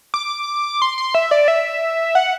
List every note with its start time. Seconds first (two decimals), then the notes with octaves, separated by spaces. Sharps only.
0.14 D6
0.82 C6
0.98 C6
1.15 E5
1.31 D5
1.48 E5
2.15 F#5